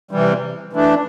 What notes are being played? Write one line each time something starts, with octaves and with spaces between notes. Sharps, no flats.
C3 E3 G3
E3 A3 D4